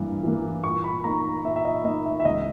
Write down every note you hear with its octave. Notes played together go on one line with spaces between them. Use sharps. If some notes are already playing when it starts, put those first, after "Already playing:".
Already playing: G2 E3 A#3
E3 A#3
A#2 C#6
B5
A#3 D#4 A#5
A#2 E5
E5
D#5
A#3 D#4 D#5
E5
E5
C#2 D#5